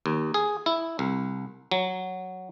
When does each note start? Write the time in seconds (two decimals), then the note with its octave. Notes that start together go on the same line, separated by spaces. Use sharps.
0.06 D#2
0.34 G#4
0.66 E4
0.99 C2
1.71 F#3